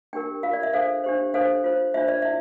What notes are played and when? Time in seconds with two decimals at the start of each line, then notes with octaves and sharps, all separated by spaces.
0.13 D4 G4 A#4 G5
0.43 F4 A#4 F5
0.53 D5
0.63 E5
0.73 D4 A4 C5 F5
1.04 D4 G4 C5
1.34 D4 A4 C5 F5
1.64 F4 C5
1.94 D4 F4 C5 E5
2.08 D5
2.22 E4 E5